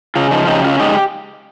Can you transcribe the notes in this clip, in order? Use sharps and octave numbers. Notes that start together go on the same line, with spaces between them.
C#3 F4
F3 D#4
C#3 D#4 G4
C#4 F4
G#3 D#4 G4